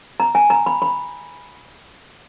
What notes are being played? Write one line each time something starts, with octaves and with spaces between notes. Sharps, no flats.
A#5
G#5
A#5
B5
B5